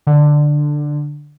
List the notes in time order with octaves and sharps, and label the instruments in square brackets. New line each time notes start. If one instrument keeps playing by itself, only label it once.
[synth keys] D3